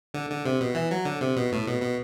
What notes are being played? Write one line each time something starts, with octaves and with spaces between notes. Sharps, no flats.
D3
D3
C3
B2
E3
F#3
D3
C3
B2
A2
B2
B2